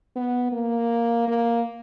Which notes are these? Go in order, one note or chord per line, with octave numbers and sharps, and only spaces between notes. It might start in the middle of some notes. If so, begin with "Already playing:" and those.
B3
A#3
A#3